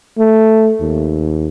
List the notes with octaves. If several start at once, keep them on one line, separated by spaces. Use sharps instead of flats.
A3
D#2